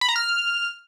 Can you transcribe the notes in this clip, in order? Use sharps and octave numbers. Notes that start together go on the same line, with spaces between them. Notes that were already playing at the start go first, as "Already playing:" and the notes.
B5
A#5
F6